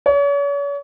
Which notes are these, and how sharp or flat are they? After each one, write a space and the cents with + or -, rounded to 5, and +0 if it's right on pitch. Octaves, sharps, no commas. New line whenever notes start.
C#5 +40